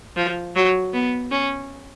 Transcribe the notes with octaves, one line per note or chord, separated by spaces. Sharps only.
F3
F#3
B3
C#4